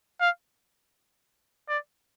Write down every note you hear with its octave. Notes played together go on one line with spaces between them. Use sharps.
F5
D5